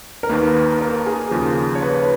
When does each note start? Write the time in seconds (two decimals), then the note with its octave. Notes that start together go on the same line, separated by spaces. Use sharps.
0.23 A#4
0.29 D#2 D#3 A#3 B4
0.81 A#4
1.06 G#4
1.31 D#2 C#3 F3 A#3
1.75 C#5
1.82 B4